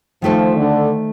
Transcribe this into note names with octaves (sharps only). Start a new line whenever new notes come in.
D#3 F3 A3 D#4 A4 C5
D3